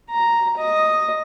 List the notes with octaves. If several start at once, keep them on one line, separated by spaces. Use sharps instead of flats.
A#5
D#5